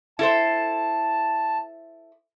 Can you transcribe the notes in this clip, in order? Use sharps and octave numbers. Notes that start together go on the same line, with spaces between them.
E4 A4 C5 A5